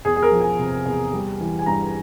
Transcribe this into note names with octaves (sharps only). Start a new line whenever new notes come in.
E2 G#4
G#4
A#4
F3
G#5
C3
E2
G3
E3
G#5
G2 A#5